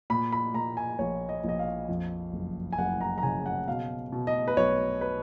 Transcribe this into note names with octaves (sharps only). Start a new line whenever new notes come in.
A#2 B5
B5
A#2 A#5
G#5
A#1 C#5
D#5
A#1 D#5
F5
F2
F#1
G#5
F#1 F#5
A#5
A#5
C#3 G#5
F#5
B2 F5
B2
D#5
B4
B1 C#5
B4